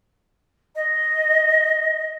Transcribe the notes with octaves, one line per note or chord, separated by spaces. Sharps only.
D#5